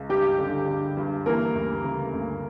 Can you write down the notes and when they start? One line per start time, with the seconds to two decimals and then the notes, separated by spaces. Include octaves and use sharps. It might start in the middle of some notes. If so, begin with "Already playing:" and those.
Already playing: C#2
0.09 G2 G3 G4
0.38 D3
0.68 D3
0.97 G2
1.26 E3 A#3 A#4
1.55 D2
1.84 C#3
2.14 D2